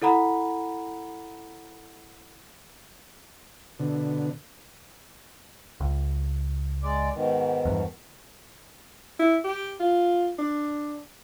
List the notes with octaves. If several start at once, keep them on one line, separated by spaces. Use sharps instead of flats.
E4 A4 F#5 A#5 B5
B2 D3
C#2
G#3 D5
G#2 B2 D#3
E2 G2
E4
G4
F4
D4